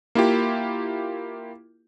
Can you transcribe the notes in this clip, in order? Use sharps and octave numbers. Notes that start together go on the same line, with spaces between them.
A#3 E4 F4 G4